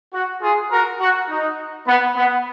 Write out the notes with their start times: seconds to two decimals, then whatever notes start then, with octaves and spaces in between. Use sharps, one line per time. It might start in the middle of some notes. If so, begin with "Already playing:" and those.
0.13 F#4
0.42 F4 G#4
0.71 F#4 A#4
1.00 F#4
1.29 D#4
1.87 B3
2.16 B3